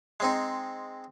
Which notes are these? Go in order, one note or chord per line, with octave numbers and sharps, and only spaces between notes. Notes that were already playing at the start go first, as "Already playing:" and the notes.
G#3 C4 D#4